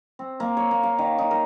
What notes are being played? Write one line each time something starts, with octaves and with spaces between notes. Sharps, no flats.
C4
A#3
C#5
A#3
F5
D#3
D#4
A#4